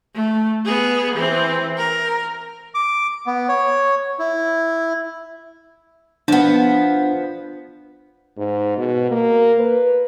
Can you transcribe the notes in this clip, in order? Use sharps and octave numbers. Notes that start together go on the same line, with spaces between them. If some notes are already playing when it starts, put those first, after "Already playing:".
A3
B3 G#4
E3 C4
A#4
D6
B3
C#5
E4
F3 B3 D4
G#2
B2
A#3
B4